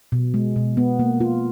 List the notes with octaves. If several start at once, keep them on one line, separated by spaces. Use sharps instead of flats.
B2
G#3
B2
B3
A#3
F4